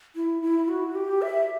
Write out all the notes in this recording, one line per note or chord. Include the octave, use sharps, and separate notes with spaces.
E4
E4
F#4
G4
E5